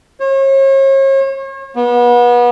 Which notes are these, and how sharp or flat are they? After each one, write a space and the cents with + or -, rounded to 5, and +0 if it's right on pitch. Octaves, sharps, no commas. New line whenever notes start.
C#5 -40
B3 -30